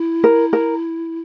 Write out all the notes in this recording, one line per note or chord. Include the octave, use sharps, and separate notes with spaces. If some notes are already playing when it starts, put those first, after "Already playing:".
Already playing: E4
A#4
A#4